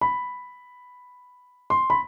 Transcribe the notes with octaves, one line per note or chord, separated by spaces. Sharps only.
B5
C6
B5